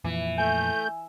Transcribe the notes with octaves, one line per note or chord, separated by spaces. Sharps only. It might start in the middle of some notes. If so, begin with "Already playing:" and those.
F2 A#2 E3 F3
A3 G#5 G6